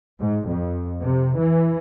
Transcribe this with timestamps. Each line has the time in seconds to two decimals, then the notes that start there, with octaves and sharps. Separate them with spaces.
0.20 G#2
0.49 F2
1.01 C3
1.37 E3